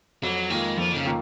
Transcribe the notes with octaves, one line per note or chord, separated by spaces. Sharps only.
F2 F#3
D#3 G#3 A#3 F4
F2 F3
D#3
C#3
D#3 A#3 F4